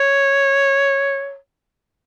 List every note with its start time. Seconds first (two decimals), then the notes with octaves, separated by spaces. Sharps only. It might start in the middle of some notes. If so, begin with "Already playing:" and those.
Already playing: C#5